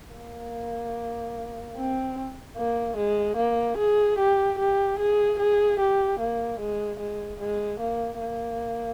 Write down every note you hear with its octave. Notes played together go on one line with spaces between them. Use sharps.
A#3
C4
A#3
G#3
A#3
G#4
G4
G4
G#4
G#4
G4
A#3
G#3
G#3
G#3
A#3
A#3